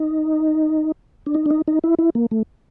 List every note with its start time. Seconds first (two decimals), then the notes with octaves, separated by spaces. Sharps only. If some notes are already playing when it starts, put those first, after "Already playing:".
Already playing: D#4
1.26 D4
1.35 D#4
1.46 D4
1.50 D#4
1.68 D#4
1.84 E4
1.99 E4
2.15 A#3
2.31 A3